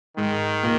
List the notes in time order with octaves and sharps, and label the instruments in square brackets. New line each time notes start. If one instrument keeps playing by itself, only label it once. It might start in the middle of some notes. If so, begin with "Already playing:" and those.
[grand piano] G#2 G#3 [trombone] D#3
[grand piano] A#2 A#3